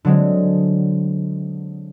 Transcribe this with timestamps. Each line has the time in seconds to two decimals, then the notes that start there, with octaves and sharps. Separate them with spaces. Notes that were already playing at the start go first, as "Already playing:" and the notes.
0.05 D3 F#3 G#3 C4